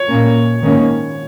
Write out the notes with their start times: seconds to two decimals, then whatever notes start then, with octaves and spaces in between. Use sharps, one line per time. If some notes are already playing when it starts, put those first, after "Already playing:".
Already playing: C#5
0.08 A#2 A#3 C#4
0.62 G#2 D#3 A#3 C#4